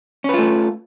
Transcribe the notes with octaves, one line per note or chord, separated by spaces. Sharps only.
A3 C#4 F4 B4